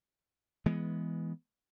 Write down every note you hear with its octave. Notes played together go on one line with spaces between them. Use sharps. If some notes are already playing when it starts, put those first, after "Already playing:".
E3 G#3 B3